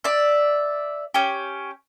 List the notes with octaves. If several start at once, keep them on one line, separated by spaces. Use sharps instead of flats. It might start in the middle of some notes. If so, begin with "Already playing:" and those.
D5 E5
C#4 G4